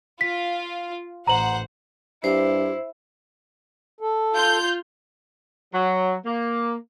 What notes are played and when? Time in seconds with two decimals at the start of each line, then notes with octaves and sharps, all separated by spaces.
0.21 F4 B6
1.27 A1 C5 F#5 A#5 F#7
2.24 G2 E4 G4 C5
4.01 A4
4.32 F4 G6
5.74 F#3
6.26 A#3